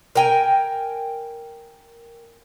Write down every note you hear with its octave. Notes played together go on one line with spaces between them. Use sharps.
A#4 G5 G#5